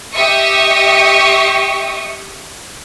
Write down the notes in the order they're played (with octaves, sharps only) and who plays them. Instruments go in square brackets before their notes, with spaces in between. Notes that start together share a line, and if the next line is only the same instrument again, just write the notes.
[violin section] G4 D#5 E5 C#6 D#6